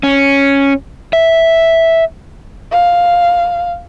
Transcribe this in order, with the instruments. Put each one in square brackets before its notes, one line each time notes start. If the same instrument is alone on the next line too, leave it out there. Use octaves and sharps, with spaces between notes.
[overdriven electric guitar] C#4
E5
[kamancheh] F5